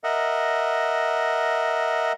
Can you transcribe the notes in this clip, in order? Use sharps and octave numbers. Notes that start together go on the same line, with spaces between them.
A#4 D#5 E5 F#5